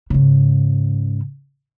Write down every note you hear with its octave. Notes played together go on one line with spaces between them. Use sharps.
G#2 C#3